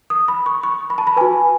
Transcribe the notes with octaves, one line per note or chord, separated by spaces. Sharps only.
D#6
B5
C#6
C#6
B5
A5
B5
F#4 B4 G#5